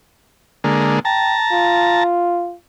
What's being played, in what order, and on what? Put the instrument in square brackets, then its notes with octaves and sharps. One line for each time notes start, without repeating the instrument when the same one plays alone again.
[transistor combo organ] D3 G#3 A#3
[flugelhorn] G5 [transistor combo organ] A5 A#5
[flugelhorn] F4